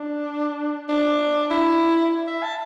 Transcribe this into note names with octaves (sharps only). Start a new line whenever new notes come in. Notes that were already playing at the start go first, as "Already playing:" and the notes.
Already playing: D4
D4
E4
E5
A5